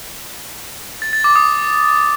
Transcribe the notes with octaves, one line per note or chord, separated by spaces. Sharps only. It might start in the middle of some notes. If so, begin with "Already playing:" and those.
A6
A6
D6
D#6